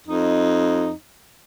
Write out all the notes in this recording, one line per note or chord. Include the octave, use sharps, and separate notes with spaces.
F2 D#4